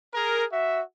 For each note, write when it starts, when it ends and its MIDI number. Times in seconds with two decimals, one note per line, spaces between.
0.14 0.44 68
0.14 0.44 70
0.52 0.81 66
0.52 0.81 76